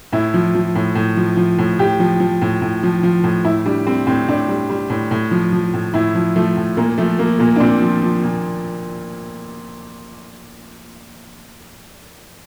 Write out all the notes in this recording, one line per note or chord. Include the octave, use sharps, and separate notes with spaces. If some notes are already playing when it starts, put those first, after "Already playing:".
A2 E4
F3
F3
A2
A2
F3
F3
A2
A2 G4
F3
F3
A2
A2
F3
F3
A2
A2 E4
G3 D4
G3 C4
A2 C4
A2 D4
G3
G3
A2
A2
F3
F3
A2
A2 E4
F3
F3 A3
A2
A#2 A#3
F3 A3
F3 A#3
A#2 A#3
D4
A#2 C4
F3
F3
A#2